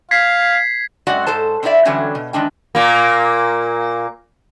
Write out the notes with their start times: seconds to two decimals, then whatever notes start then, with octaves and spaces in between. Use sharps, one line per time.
0.11 F5 G#6 B6 C7
1.07 F#2 G#3 C4 F#4 D5 F#5
1.26 G#2 A4 C5 A5
1.63 C4 D4 E4 C#5 D5 E5
1.85 D3 E3 F#3 G3 C4 C#4
2.15 B2
2.33 E2 D#3 G#3 D4 G5
2.75 A#2 A#3